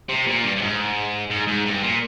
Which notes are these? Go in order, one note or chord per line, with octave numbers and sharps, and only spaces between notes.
C3
A#2
G2
G2
G#2
G#2
G#2
G2
A#2